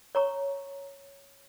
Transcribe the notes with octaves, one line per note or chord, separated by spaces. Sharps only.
C#5 A#5 C#6